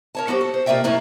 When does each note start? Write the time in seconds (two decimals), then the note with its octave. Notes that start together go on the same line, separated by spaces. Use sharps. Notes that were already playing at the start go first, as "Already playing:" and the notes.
0.15 A#4 C#5 A5
0.27 F#3 B3 F#4 G4 C5
0.41 A4
0.54 C5
0.66 B2 A#3 F4 D5 E5 G5
0.84 F#2 A2 A#3 E4 A#5